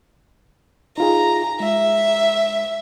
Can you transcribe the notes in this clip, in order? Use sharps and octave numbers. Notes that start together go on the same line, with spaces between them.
D#4 F4 G#4 A#5
G#3 E5